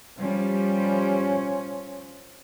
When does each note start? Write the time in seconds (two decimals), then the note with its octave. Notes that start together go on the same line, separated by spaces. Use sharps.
0.18 F3 G3 C#4